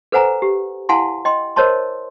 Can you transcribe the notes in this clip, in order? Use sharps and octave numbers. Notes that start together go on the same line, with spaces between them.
A4 B4 C5 F#5 G#5 A#5
G4
E4 F5 F#5 G#5 A5 C6
D#5 G5 C6
A#4 C5 C#5 D#5 A5 C6